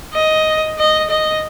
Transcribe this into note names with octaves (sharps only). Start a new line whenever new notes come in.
D#5
D#5
D#5